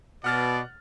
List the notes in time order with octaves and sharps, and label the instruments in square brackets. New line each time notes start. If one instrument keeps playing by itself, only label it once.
[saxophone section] B2 [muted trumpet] D5 [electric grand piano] F#5 F6 A6